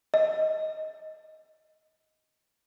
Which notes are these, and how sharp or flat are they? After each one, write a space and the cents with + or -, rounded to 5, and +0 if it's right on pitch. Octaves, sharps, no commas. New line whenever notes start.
D#5 +10